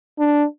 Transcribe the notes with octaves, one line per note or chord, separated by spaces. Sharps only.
D4